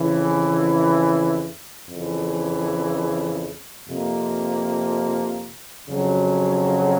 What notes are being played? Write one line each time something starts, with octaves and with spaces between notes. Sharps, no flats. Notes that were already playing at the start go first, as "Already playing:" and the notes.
Already playing: F2 C#3 E3
F2 C#3 E3
F2 C3 F3 A#3
F2 C#3 F#3